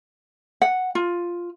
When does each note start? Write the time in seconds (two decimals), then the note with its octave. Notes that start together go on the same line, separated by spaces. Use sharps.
0.62 F#5
0.95 F4